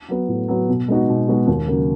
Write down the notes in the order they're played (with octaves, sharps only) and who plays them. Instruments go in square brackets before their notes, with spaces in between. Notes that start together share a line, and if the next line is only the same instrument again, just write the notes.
[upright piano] F#3 B3
A2
F#3 B3
B2
G#3 B3 D#4 F#4
B2
G#3 B3 D#4 F#4
D#2
C#3 F#3 A#3